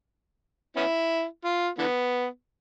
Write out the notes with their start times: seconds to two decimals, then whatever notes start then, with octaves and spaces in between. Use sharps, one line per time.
0.76 B3 C#4 E4
1.44 F4
1.78 D3 E3 B3